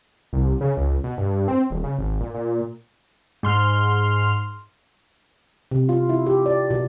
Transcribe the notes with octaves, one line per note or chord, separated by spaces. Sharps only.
C2
C#3
C#2
B2
G2
C4
D#1
C#3
G#1
A#2
A#2
G#2 C6 F6
C3
F4
E4
G4
D5
B2